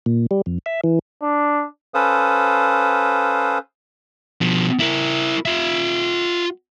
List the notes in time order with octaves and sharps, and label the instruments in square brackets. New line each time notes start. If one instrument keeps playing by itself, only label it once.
[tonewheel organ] A#2
G3
F2
E5
E3
[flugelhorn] D4
[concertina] C#4 A4 B4 C5 F5 D#6
[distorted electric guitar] B2 F3
E4 A#4
F4 E5